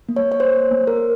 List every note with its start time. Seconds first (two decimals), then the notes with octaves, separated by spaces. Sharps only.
0.09 A#3
0.16 C#5
0.32 C#5
0.40 A#3 C5
0.71 A#3
0.87 A#4